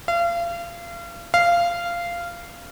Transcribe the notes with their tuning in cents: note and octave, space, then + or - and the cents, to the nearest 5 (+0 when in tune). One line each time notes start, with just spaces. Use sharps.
F5 -35
F5 -15